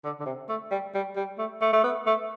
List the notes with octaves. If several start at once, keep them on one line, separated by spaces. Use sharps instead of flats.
D3
D3
C3
A3
G3
G3
G3
A3
A3
A3
B3
A3